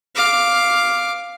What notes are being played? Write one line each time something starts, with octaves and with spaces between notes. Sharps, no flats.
F5 D6